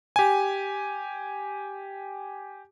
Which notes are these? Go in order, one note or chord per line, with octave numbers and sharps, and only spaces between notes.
G4 G#5